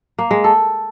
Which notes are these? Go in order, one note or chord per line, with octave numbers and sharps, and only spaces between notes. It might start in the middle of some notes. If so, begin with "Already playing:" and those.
A#3
G#3
A4